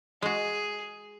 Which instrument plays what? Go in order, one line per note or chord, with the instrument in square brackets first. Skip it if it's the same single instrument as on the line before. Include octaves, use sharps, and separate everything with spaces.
[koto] G#3 F#4 [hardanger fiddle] G#4